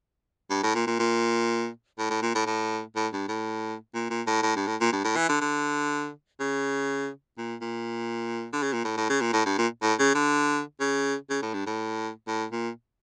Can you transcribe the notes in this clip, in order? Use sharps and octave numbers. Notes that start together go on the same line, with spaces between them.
G2
A2
A#2
A#2
A#2
A2
A2
A#2
A2
A2
A2
G2
A2
A#2
A#2
A2
A2
G2
A2
A#2
G2
A2
E3
D3
D3
C#3
A#2
A#2
D3
C#3
A#2
A2
A2
C#3
A#2
A2
G2
A#2
A2
C#3
D3
C#3
C#3
A2
G2
A2
A2
A#2